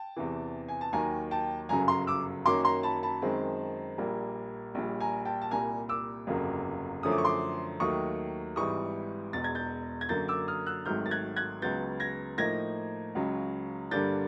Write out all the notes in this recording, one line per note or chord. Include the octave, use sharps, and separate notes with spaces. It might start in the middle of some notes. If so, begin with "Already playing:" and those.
Already playing: G5 A5
E2 C3 E3
G#5
A5
D#2 D#3 F#3 G#5 A#5
G5 A5
G1 F#2 C#3 F#3 G#5 A#5
A#5 C6
D6 E6
F#2 D#3 F#3 A#3 C#4 C6 D6
A#5 C6
A5 B5
A5 B5
F#2 D#3 G#3 C4
A#1 A#2 G3 A#3
A#1 A#2 G3
G#5 A#5
G5 A5
A5
C2 A#2 G3 G#5 A#5
D6 E6
G1 F2 C#3 F#3 A#3
F#2 D3 F3 A3 C#4 D#6
D6
C#6
C6 D6
D#2 D#3 F#3 A3 C#6 D#6
G#1 G#2 E3 G3 C#6 D#6
E1 E2 B2 A6
G#6
G6 A6
G#6
F#2 D3 F#3 A#3 G6 A6
D6 E6
D#6 F6
E6 F#6
G#1 G#2 D#3 F#3 A3 F6 G6
A6
F#6 G#6
F#6 G#6
C#2 C#3 F#3 B3 G6 A6
G#6 A#6
A2 F3 A#3 D#4 G#6 A#6
C#2 C#3 F#3
G2 D3 G3 A#3 D4 G6 A6